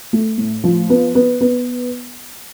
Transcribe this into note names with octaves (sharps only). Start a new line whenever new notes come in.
A3
A2
F3
B3
B3
B3